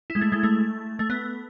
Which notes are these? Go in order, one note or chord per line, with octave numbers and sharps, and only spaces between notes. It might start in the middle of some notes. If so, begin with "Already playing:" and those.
E4
G#3
A3
G#3
A3
A3
B3